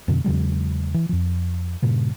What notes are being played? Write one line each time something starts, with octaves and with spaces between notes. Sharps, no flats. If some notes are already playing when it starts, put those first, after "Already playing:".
F2 B2 D3
E2 C#3 F#3 G#3
E3
F2 F3
G2 A#2 C#3